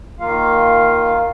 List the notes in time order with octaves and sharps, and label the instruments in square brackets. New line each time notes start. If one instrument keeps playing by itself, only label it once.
[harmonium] D#3 A#3 F4 F5